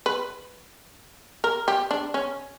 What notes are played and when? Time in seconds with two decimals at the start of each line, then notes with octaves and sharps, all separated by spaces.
0.06 B4
1.44 A#4
1.68 G4
1.91 D4
2.14 C#4